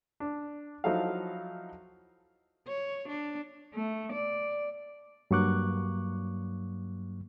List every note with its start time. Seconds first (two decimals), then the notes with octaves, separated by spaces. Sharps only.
0.20 D4
0.84 F3 F#3 D#4 E4 A4 F5
2.67 C#5
3.08 D4
3.74 A3
4.12 D5
5.31 G2 F#3 A#3 C#6 D6 F#6